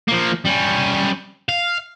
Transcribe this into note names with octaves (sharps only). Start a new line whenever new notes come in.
F3 A#3
G3 C#4
F5